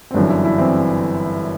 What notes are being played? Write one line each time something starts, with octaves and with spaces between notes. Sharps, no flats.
C4
G1 F#2 E3 D4
E4
E4
E3 C4